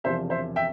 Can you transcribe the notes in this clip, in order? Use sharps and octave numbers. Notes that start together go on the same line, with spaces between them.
E1 E2 C3 F3 C5 E5
C5 E5
E5 G5